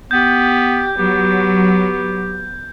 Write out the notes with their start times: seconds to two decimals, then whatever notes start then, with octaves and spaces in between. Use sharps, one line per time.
0.11 B3 G4 G6
0.98 F#3 B3 G4